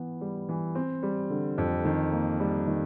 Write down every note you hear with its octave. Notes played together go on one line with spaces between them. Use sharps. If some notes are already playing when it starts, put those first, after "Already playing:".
Already playing: E3 B3
G3
E3
C4
G3
D3
F2
D#3
A#3
G3
D#3